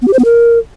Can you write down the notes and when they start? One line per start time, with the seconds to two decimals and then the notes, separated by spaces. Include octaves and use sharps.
0.02 B3
0.08 G4
0.13 C5
0.19 B3
0.25 A#4